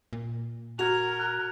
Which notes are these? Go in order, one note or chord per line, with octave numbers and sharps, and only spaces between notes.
A#2
F#4 A#4 F6 G#6 F7
F#6